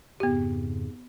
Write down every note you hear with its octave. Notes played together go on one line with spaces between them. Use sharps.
F2 G#2 C#3 B3 G4